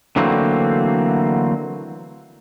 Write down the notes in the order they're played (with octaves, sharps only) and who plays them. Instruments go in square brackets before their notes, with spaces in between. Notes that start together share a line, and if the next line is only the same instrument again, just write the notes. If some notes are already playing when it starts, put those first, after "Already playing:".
[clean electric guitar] D3 E3 F#3 A3 A#3 C4